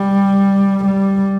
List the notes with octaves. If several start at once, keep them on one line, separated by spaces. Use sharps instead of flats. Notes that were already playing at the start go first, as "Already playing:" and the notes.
Already playing: G3
G3